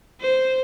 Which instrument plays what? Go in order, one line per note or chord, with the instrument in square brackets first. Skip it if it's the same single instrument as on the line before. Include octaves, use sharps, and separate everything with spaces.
[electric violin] C5